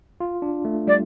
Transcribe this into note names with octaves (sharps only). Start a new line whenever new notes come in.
F4
D4
A3
G3 D5